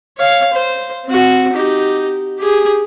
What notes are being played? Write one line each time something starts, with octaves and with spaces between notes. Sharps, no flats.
C#5 F5
C5
C4 F#4
D#4 G4
G4 G#4